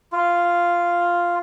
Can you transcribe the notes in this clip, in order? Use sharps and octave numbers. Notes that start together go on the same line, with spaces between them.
F4